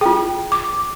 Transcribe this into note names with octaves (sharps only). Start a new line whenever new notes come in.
F4 G#4 G5
D6